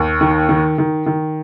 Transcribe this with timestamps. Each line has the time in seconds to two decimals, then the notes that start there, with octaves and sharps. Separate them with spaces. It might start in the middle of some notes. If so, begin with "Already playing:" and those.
Already playing: D#2
0.21 D#3
0.49 D#3
0.78 D#3
1.06 D#3